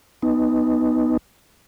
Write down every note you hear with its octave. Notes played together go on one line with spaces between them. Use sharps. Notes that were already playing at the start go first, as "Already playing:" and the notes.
B3 D#4